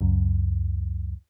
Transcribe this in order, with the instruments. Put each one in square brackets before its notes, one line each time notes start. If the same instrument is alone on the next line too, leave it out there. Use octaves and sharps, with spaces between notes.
[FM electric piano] C#2 F#2